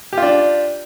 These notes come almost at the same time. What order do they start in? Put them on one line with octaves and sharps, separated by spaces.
G4 F4 D4